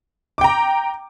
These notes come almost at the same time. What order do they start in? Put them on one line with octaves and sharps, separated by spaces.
D6 G5 A#5